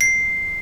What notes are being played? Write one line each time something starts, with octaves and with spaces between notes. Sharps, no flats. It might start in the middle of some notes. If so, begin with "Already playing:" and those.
C7